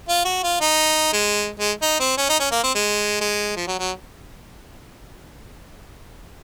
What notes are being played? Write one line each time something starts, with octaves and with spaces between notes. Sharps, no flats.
F4
F#4
F4
D#4
G#3
G#3
D#4
C4
C#4
D#4
C#4
A#3
C4
G#3
G#3
F3
F#3
F#3